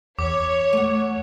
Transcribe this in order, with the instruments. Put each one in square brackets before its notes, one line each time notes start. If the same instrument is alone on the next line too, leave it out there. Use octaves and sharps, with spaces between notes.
[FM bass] E2 [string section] C#5 [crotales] D6
[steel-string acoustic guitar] A3 F#5